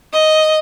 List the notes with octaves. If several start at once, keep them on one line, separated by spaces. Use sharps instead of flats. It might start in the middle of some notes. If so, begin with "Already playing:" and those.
D#5